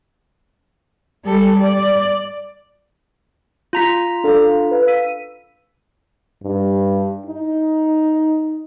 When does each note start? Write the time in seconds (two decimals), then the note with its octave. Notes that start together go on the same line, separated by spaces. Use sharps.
1.25 G3 A4
1.60 D5
3.73 F4 A#5 B6
4.24 D4 A4 F5
4.71 B4 F5
4.87 E6 B6 D#7
6.43 G2
7.26 D#4